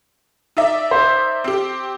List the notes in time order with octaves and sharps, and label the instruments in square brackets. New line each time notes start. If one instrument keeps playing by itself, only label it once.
[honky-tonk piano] D#4 D5 E5
[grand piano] C5
[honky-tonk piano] C4 G4